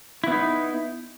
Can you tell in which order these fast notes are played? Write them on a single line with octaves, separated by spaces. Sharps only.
E4 B3 D#4